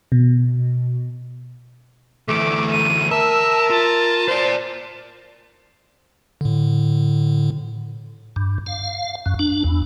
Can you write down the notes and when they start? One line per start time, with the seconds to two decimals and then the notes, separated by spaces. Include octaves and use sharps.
0.12 B2
2.28 D2 E3 A3 D6
2.72 D#7
3.11 A#4 E5 A5 E6
3.70 F4 A5
4.28 F4 C5 D5
6.41 A2 D3
8.36 G2
8.66 F5
9.26 F#2
9.39 D4
9.64 E2